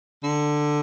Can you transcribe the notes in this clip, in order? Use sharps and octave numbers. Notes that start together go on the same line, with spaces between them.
D3